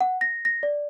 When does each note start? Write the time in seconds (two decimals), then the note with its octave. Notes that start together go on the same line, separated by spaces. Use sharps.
0.01 F#5
0.21 A#6
0.45 A#6
0.63 D5